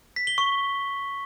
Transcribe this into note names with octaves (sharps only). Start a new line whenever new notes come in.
B6
G7
C#6